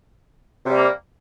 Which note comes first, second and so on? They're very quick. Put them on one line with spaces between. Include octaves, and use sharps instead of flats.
C3 G3 A#3